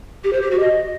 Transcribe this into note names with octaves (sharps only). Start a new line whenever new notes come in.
G4
C5
G4
F#4
D#5